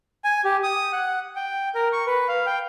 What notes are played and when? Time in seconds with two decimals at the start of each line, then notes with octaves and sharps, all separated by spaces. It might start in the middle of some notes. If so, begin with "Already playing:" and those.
0.24 G#5
0.44 G4
0.63 D#6
0.93 F#5
1.36 G5
1.75 A#4
1.92 C#6
2.07 B4
2.28 F5
2.46 G5